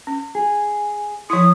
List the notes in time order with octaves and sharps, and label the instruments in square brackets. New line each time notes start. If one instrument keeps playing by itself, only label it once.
[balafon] C#4
[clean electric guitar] G#4
[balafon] F3 E4 [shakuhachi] D#6